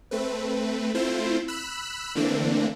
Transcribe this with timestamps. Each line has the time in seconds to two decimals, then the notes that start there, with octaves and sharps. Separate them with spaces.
0.11 A3 C4 B4
0.94 A3 C4 E4 F4 C5
1.48 B5 E6 F#6
2.15 D3 E3 A3 A#3 C4 D4